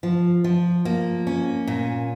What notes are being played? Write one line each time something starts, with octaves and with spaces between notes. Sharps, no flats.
F3
F3
A#3
C#4
A#2